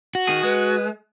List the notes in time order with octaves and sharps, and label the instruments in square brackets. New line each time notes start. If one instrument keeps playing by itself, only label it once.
[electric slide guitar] F#4
[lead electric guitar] D#3 G#4
[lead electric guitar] G#3 [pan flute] B4